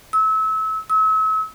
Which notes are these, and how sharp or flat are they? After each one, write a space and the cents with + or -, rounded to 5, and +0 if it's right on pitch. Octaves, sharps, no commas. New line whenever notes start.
E6 -30
E6 -40